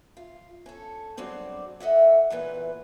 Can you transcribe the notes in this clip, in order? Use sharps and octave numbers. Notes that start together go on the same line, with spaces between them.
F4
C#4 A4
G2 F#3 G#3 C4 D5
A4 D#5 E5 F#5
E2 A#2 E3 B4